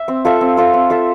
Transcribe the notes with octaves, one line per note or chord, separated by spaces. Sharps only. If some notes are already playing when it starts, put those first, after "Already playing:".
Already playing: E5
C4
F4 A4 E5
C4
F4 A4 E5
C4
F4 A4 E5